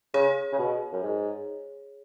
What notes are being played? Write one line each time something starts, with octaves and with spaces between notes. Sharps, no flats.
C#3 G#4 C#5
C#3
B2
F#2
G#2